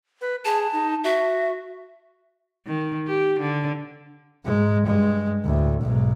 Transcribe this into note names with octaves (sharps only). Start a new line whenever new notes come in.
B4
G#4 A5
D#4
F#4 E5
D#3
G4
D3
G#2 G#3
G2 G#3
D2 A2
B1 G#2